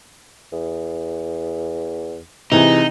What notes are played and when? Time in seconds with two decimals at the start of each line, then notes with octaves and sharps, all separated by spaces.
0.52 E2
2.52 C3 E3 G#3 D#4